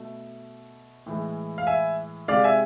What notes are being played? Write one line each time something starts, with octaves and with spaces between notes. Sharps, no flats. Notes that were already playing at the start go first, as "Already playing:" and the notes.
Already playing: B2 A3
A2 E3 G#3
F5
E5 G#5
C3 G#3 D5 F5
E5 G#5